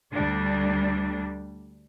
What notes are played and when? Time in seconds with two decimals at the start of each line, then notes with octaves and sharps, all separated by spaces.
0.11 D2 G3 D4